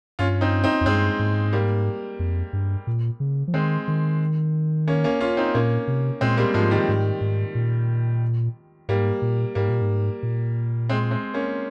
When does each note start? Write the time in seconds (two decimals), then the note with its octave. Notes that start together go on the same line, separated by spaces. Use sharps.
0.19 G2 C#4 F4
0.41 C4 D#4
0.64 C4 D#4
0.81 F2
0.86 G2 G#3 C4
1.19 G#2
1.53 G3 A#3
2.19 F2
2.53 G2
2.87 A#2
3.20 C#3
3.47 F3
3.54 D#3 G#3 C4
3.88 D#3
4.88 A#3 C#4
5.04 A#3 C#4
5.20 C#4 F4
5.37 C4 D#4
5.55 A#2 A#3 C#4
5.88 C3
6.21 A#2 G#3 C4
6.37 G3 A#3
6.54 G#2 F3 G#3
6.71 D#3 G3
6.89 G#2
7.21 G#2
7.55 A#2
8.89 G#2 G3 A#3
9.22 A#2
9.55 G#2 G3 A#3
9.70 A#2
9.82 G#2
10.23 A#2
10.89 G#3 C4
11.11 G#3 C4
11.34 A#3 C#4